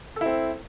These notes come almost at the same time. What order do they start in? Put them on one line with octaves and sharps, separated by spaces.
A4 E4 C4